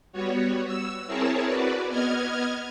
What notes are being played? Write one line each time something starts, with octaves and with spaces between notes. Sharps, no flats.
G3 B3 F#4 C#5
E6
C4 E4 G#4 A#4 C#5 A5
F#4 B4 D5
B3 D#5 F6 G#6